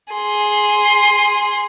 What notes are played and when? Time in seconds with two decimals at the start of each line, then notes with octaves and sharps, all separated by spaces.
0.13 G#4 C6